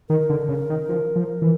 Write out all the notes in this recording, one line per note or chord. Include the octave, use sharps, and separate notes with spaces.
D#3 A#4
D3
C#3
D#3
F3
F3
E3